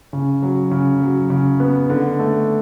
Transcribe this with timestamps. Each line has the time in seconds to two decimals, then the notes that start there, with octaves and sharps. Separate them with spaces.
0.13 C#3
0.42 F#3
0.71 C#3
1.01 F#3
1.30 C#3
1.60 B3
1.89 D3
2.19 A3